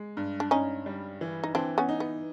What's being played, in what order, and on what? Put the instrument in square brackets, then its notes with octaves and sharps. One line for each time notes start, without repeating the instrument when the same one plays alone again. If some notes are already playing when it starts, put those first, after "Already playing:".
Already playing: [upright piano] G#3
G2
[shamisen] D4
[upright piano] G2 [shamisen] C#4 D#4
[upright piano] G3
E3
[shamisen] D#4
[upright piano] E3 [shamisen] C4 D4
[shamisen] B3 C#4
[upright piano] D#4
[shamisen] B3